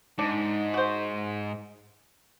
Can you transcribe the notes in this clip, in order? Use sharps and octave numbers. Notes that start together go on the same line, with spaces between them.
G#2 D4
F#4 C5